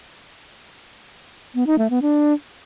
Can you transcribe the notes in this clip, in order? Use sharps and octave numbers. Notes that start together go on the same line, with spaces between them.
B3
D#4
A3
B3
D4